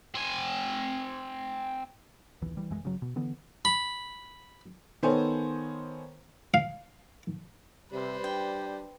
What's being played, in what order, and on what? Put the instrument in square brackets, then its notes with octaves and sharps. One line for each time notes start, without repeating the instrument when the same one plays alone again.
[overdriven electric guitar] C4 G#5
[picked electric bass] D#1 B1 E3
C2 E3 G3
B1 F#2 E3 G#3
G1 C#3 F#3
B2
D3 E3 B3
[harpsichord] B5
[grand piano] D#3 B3 A4 C5 C#5 G#5
[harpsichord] F5
[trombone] C3 [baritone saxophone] G3 [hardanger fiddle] B4 C5
[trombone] D4 [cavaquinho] G5